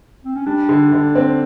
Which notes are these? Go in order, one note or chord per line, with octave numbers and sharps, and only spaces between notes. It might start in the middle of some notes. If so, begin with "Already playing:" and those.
C4
C#4
G3 D4
D3
D3
C4